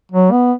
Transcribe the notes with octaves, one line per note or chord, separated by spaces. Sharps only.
F#3
B3